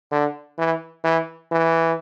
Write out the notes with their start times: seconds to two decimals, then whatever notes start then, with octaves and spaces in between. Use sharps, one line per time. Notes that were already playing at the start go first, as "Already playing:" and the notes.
0.12 D3
0.59 E3
1.04 E3
1.52 E3